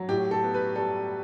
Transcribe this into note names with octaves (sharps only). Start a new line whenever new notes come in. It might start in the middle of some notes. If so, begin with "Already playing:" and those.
Already playing: F#3
A2 G4
A4
B3
B4
G3 A4